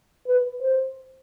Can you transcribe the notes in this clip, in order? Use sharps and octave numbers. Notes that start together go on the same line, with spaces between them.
B4
C5